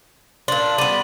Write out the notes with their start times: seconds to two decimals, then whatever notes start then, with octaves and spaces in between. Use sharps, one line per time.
0.48 A#2 D4 C6 F#7
0.78 G3 B3 D6 D#7 F#7